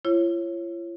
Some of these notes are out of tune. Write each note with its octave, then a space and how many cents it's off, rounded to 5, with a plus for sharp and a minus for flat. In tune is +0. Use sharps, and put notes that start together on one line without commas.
F4 -45 C#5 -20